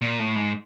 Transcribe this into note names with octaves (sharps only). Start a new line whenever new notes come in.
A#2
A2
G#2